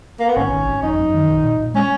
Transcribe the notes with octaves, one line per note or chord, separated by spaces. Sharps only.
A#3
B3
G#1 C#4
G#1
G#1
F#2 D#4
F#2
D#3
A#1
A#2
A#2
G#3 C#4